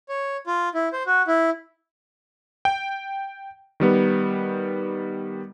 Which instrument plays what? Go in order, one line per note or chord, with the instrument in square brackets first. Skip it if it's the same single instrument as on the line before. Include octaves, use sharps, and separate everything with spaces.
[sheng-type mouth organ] C#5
F4
E4
C5
F#4
E4
[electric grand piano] G5
D#3 G3 B3